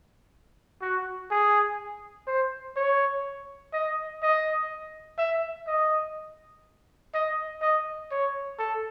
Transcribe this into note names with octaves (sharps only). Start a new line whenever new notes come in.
F#4
G#4
C5
C#5
D#5
D#5
E5
D#5
D#5
D#5
C#5
A4